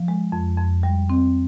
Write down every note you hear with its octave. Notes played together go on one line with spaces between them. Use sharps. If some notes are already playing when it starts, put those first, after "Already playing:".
Already playing: F3
G#3
F2
F2
G3
C4